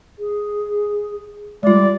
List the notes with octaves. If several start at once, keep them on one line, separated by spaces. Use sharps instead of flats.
G#4
G3 G#3 F4 D5